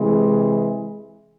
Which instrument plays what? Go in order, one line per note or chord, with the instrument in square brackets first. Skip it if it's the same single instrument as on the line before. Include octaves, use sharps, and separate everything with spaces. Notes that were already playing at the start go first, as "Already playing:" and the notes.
Already playing: [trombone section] C3 E3 G#3